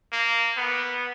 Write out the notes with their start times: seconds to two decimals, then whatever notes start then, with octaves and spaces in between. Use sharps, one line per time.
0.12 A#3
0.57 B3